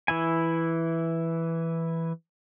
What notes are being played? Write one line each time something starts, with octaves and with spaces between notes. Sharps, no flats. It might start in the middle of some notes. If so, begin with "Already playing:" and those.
E3 E4 G#5